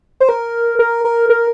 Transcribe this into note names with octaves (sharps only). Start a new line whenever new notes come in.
C5
A#4
A#4
A#4
A#4